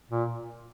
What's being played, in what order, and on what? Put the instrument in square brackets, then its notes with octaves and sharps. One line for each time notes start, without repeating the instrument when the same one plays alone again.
[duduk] A#2